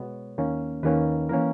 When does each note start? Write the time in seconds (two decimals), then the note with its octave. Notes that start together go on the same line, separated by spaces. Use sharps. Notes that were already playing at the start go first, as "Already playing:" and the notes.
Already playing: B2 G#3 B3 C#5
0.38 D#2 D#3 A#3 C#4
0.83 D#2 D#3 A#3 C#4 B4
1.29 E3 A#3 C#4 A#4